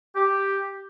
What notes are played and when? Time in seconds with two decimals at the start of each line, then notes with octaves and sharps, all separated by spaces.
0.16 G4